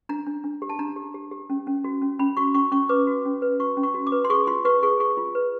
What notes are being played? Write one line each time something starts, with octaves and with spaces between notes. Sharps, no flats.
D4 A#5
D4
D4
G4
A5
D4 A#5
G4
G4
G4
C#4
C#4
F#4
C#4
C#4 B5
F#4 C#6
C#4 C#6
C#4 C#6
B4 D6
F#4
C#4
B4
F#4 C#6
C#4
C#6
F#4
D6
B4
C6
G#4 C#6
F4 C6
B4 C#6
G#4 C#6
G#4 C#6
F4
B4